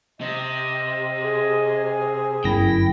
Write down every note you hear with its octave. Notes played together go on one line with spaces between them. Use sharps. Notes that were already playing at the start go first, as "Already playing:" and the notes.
C3 D#5
G#4
G1 F#2 E4 G5 A#6